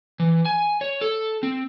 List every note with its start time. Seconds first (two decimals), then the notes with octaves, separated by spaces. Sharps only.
0.20 E3
0.45 G#5
0.81 C#5
1.01 A4
1.43 C4